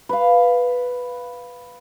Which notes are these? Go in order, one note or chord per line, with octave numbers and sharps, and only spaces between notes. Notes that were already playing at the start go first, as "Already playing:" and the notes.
B4 F5